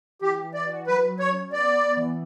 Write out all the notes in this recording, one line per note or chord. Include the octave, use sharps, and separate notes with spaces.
E3 G4
E3
D5
F#4
F#3 B4
F#3
C#5
C#4
B3 D5
B3
E3